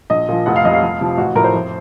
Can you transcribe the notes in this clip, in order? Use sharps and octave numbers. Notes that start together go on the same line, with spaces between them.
A#1 D#5
A#2 F3
F1 F#5
F5
F2 C3 D#5
F5
F2
C3 F3
A1 F#4
A2 F3 A#4
C5
F2